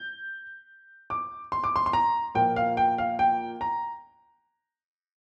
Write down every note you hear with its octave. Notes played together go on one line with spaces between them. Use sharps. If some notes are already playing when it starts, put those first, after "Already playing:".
Already playing: G6
D6
C6
D6
C6
C6
A#5
A#2 F3 A#3 G5
F5
G5
F5
G5
A#5